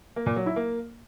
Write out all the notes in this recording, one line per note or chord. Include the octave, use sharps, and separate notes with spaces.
A#3
A#2
F#3
E4
A#3